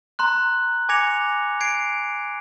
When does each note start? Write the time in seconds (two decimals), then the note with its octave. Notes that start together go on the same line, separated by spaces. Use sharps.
0.19 A#5 C6 F#6
0.89 G#5 D6 G#6 A#6 C#7 F7
1.60 G#6 C7 D7